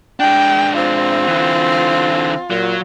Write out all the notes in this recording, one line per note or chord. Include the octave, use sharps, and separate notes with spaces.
G#3 D4 G5
C4 F4
D3 E3
A#2 F#3